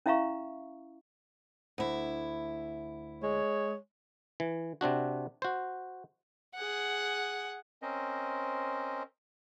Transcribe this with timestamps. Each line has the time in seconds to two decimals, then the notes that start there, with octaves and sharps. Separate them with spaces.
0.06 C#4 E4 E5 F5 A#5 C#6
1.78 D2 E4
3.23 G#3 C#5
4.40 E3
4.81 C3 C4 D4 F#4
5.42 F#4 C5
6.55 G#4 F#5
7.82 C4 C#4 A#4 C5 D#5